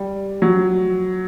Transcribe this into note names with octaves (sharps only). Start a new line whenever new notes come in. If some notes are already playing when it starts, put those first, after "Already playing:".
Already playing: G3
F#3